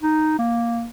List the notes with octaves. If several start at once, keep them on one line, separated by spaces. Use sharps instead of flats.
D#4
A#3